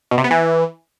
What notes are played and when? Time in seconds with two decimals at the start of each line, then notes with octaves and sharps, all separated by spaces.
0.11 B2
0.18 C3
0.24 B3
0.31 E3